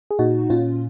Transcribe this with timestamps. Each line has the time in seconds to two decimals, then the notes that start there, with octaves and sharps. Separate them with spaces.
0.11 G#4
0.19 A#2 D#4 F#4
0.50 A#2 C#4 F4